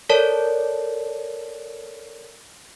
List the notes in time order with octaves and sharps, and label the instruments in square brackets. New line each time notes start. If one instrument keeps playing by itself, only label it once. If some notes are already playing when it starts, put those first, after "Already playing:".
[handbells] A4 A#4 C#5 D5 A5